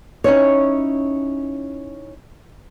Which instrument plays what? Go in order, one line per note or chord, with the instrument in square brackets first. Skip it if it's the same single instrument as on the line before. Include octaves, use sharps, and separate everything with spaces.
[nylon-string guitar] C#4 D#4 E4 C#5